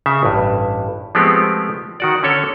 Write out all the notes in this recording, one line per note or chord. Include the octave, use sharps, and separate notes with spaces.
C#3 E5
A1 G2
F3 G#3 A3 B3 C4 G4
D#3 F#4 D5
D3 C#4 A4 C#5